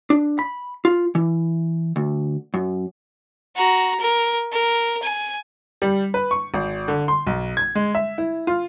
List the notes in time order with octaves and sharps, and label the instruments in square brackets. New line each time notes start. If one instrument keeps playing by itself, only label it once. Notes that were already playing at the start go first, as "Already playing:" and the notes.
[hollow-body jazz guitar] D4
B5
F4
E3
D2
F#2
[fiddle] F#4 A#5
A#4
A#4
G#5
[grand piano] G3
B4
C#6
G#1
D3
C6
B1
G#6
G#3
E5
E4
F4